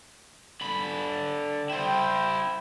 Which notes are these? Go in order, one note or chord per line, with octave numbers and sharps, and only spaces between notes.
D3 B5
E4 C5 G5